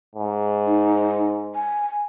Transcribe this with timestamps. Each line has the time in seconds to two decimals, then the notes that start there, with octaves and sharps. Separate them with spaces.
0.15 G#2
0.66 D#4
1.55 G#5